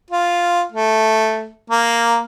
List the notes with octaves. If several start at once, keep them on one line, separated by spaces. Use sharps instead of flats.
F4
A3
A#3